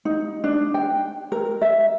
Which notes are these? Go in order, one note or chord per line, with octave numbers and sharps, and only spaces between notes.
D#4
D4
G5
A#4
E5